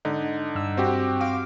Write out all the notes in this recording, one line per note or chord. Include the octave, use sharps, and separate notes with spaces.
G#2 D3 D#4
G2 E6
C4 F#4 G4
F5 D6